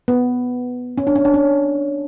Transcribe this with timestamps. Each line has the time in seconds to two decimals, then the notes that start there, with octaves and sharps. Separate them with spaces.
0.08 B3
0.98 C#4
1.07 D4
1.16 C#4
1.25 D4
1.34 C#4